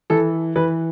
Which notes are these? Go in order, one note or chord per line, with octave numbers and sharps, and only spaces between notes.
E3 A4
E3 B4